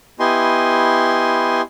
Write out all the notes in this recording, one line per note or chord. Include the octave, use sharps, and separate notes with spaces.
B3 E4 G4 D#5 G#5 C6